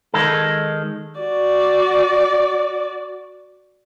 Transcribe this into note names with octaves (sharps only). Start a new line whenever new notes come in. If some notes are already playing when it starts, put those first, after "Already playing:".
D#3 G#3 A4
F#4 D5